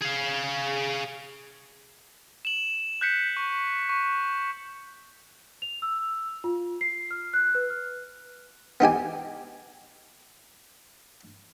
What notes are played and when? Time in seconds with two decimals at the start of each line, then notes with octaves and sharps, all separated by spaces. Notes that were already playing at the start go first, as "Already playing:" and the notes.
0.02 G#4 F5
2.45 E7 F#7
3.01 F#6 G6 B6 C#7
3.37 C#6
3.89 C#6
5.62 F7
5.82 E6
6.44 F4
6.81 C7
7.11 F6
7.33 F#6
7.55 B4
7.70 F6
8.80 B3 D#4 G4 G#5